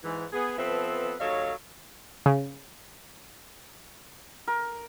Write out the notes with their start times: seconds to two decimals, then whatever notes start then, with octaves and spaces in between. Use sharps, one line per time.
0.03 G#2 E3
0.33 B3 G#4
0.58 F3 B3 C4 A4 B4 E5
1.20 D#2 F#3 A4 C#5 D#5 F5
2.26 C#3
4.48 A#4